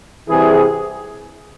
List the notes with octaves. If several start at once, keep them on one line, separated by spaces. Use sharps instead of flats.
C2 C3 E3 E4 G#4